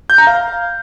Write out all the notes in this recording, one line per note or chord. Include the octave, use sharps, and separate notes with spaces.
G6
A#5
F5